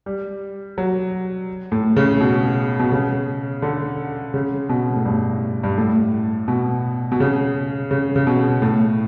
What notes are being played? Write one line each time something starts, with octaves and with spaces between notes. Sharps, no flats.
G3
F#3
A2
C#3
B2
B2
C#3
D3
C#3
B2
A2
G2
G2
A2
B2
B2
C#3
C#3
C#3
B2
A2